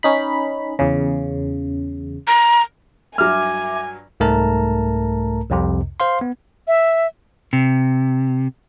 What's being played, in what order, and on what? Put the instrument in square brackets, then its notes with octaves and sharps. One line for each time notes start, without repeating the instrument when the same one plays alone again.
[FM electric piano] C#4 D#4 B5
E2 C#3
[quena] A#5
[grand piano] G2 F#3 [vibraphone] E5 D6 [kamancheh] G#5 [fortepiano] F6
[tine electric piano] C2 G#2 A3 A#4 A5 A#5
C2 F2 C3
C5 F5 C6
B3
[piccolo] E5
[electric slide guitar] C3